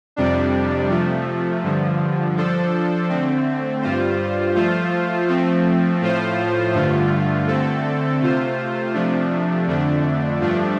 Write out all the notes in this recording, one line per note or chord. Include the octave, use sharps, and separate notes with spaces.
F2 C3 G3 D4
C3 F3 A3
G2 D3 F3
F3 D4 A4 C5
D3 A3 C4
G2 G3 F4 C5
F3 A3 F4 C5
F3 A3 C4
A2 F3 A3 F4 C5
G2 D3 A3 F4
D3 A3 C4 A4
C3 A3 F4 C5
C3 F3 A3 D4
F2 D3 A3 D4
G2 F3 A3 D4